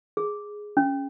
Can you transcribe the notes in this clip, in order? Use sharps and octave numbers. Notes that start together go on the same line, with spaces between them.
G#4
C#4